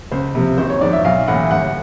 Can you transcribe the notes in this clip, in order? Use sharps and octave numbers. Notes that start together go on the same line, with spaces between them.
C#2 C5
C3 F3
G#1 C5
C#5
G#2 F3 D5
E5
B1 F5
A2 E3 F#5
G1 F#5